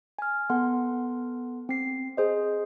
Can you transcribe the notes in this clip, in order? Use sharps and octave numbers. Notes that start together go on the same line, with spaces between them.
G#5 F6
B3 A4 F#5 C6
C4 C7
G#4 C5 D#5